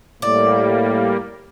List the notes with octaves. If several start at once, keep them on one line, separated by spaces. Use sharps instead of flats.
A2 G3 A#3 D5